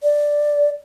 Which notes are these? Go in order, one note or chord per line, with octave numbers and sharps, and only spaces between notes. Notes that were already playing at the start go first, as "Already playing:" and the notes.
D5